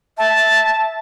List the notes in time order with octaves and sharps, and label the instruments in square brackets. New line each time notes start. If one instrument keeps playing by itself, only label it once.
[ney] E5 [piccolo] A5